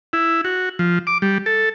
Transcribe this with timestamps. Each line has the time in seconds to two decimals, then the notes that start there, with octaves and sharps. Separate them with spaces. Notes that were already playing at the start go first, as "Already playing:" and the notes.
0.13 E4
0.45 F#4
0.79 F3
1.07 D6
1.22 G3
1.46 A4